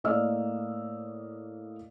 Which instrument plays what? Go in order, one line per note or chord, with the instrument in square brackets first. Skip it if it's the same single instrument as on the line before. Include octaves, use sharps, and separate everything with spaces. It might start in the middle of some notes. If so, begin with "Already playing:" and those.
[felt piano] A2 A#3 D5 D#5 E6 F6